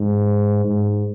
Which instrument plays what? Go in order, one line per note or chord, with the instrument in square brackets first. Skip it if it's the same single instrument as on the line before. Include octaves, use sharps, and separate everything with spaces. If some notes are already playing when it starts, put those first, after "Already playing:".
Already playing: [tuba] G#2
G#2